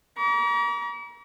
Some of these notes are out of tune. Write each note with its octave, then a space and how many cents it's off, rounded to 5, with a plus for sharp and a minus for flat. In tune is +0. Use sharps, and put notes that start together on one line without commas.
A#5 +35 D6 -40